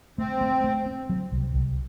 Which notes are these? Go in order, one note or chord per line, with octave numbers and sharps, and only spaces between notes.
A3 C4
A3
A3
C4
F#3
C2
C2